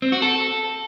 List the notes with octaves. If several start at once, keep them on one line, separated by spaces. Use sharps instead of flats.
C4
F#4
A4